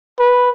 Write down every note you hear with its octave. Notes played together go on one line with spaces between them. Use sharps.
B4